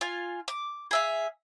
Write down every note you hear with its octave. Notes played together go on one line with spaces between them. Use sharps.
F4 G#5
D6
G#4 E5 F5